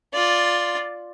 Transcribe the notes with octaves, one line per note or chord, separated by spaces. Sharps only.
F4 D5